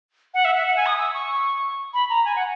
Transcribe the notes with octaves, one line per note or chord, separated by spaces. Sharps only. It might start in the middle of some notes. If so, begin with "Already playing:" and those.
F#5
E5
E5
F#5
G#5
D#6
E6
C#6
B5
A#5
G#5
F#5